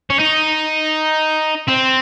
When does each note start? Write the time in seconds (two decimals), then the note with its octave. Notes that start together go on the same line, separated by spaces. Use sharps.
0.10 C#4
0.19 D#4
1.68 C4